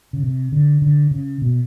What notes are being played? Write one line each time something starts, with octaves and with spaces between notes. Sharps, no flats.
C#3
C3
D3
D3
C#3
B2